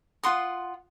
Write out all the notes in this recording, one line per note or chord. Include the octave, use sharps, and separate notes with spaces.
F4 F#5 C6 D#6